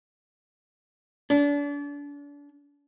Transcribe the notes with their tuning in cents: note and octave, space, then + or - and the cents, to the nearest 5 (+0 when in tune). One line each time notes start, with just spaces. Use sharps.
D4 -35